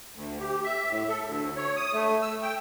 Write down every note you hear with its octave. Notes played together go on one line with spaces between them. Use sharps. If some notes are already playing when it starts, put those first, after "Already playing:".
D2
G4
E5
A2
A4
D2
C#5
D#6
A3
E6
G5